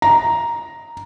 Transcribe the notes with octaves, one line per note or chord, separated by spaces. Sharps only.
A#5